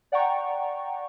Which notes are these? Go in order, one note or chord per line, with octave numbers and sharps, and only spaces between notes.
D5 F#5 G5 A#5 C#6